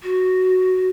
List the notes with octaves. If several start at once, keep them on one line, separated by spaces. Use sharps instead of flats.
F#4